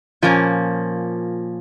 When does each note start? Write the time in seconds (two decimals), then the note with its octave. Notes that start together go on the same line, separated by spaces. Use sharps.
0.22 A#2 F3 A#3 C#4